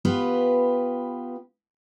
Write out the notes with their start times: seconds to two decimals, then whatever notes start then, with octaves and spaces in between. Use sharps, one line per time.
0.05 B3 F4 G4 B4